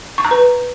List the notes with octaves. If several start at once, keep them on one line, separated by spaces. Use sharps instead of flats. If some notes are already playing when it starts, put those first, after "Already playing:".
C#6
A#5
B4